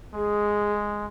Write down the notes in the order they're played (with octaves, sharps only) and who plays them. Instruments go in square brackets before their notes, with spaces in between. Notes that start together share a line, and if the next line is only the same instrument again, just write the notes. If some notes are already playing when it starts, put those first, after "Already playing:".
[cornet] G#3 [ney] G#4